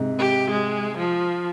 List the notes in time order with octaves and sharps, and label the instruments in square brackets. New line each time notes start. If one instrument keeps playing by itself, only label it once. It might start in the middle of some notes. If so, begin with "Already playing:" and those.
Already playing: [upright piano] G#2 C3
[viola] G4
G#3
F3